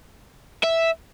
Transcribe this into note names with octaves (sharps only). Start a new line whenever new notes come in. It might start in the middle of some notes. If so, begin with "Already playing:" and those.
E5